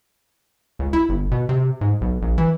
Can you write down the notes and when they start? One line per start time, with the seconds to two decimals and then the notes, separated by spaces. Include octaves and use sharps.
0.79 C#2
0.93 E4
1.09 G1
1.31 B2
1.49 C3
1.81 G#2
2.01 B1
2.22 A#1
2.38 E3